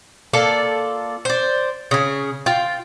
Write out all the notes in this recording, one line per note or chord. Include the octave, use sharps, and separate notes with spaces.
A#3 F4 A4 D5
C5 D5
C#3 G#4
F4 G5